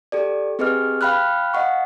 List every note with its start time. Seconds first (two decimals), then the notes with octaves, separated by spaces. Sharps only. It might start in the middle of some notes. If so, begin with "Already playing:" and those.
0.12 G4 A4 D5
0.59 C4 G4 G#4 B4 D#5 F6
1.01 F5 G5 B5 F6 F#6
1.54 D#5 F5 F#5 C#6